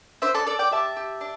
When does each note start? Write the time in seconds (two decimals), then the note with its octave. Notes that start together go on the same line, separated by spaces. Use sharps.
0.22 D4 C5 E5
0.35 A4 D5
0.46 D4 A4 D5
0.59 D5 G5
0.71 G4 E5 A5
0.96 G4
1.21 D4